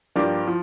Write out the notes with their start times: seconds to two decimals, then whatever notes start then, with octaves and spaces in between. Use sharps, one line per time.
0.15 G2 F3 A#3 D4 G4
0.47 F3